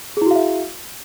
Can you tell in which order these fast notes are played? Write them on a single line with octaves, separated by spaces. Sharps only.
G#4 E4 F#4 F5 E5